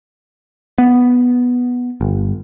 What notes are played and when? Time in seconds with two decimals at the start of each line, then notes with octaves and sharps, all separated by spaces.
0.78 B3
2.01 G1